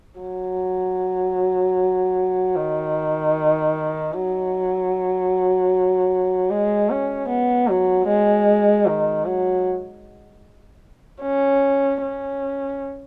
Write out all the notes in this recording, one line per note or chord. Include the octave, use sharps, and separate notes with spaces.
F#3
D#3
F#3
G#3
C#4
B3
F#3
G#3
D#3
F#3
C#4
C#4